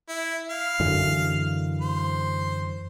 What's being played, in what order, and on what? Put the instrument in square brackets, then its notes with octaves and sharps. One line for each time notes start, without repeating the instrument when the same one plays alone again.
[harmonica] E4
F5
[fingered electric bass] F#2 D3 E3
[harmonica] C5